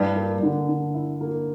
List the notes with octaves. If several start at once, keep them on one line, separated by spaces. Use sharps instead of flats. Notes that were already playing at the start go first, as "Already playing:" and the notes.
Already playing: G2 E4
A#3
D3
D3
E4
A#3